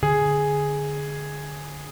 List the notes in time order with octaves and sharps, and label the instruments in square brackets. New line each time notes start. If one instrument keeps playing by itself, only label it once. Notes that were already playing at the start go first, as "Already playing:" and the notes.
[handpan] D3 [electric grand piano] G#4